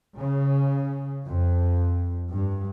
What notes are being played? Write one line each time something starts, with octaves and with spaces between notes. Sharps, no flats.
C#3
F2
G2